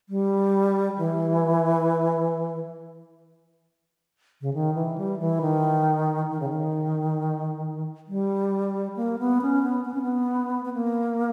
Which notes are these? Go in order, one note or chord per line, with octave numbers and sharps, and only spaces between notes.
G3
E3
C#3
D#3
E3
G3
E3
D#3
D#3
C#3
D#3
G3
A#3
B3
C#4
B3
B3
C#4
B3
B3
A#3